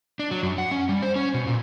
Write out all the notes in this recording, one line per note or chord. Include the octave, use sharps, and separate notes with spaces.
D4
F#3
F#2
F#5
C#4
G3
C5
C#4
B2
A#2